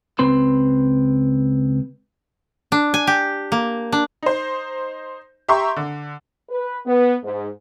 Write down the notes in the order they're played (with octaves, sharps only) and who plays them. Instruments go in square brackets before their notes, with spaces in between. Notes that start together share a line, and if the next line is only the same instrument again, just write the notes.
[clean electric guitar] C#2 C4 B4 C6
[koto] D4
G#5
G4
A#3
D4
[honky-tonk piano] D#4 C5
G4 E5 A#5 C6 C#6
D3
[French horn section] B4
B3
G#2